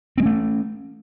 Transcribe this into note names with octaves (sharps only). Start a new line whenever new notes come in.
G#3 A3 C4 C#4